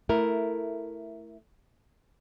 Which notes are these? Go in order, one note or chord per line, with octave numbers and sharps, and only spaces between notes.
A3 E4 A#4